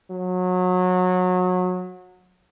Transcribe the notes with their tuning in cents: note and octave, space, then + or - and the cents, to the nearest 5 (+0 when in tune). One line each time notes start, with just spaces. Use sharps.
F#3 -25